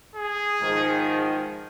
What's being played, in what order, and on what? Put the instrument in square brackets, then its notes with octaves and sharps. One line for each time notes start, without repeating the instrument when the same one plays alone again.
[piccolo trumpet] G#4
[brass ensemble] G#2 D#3 F3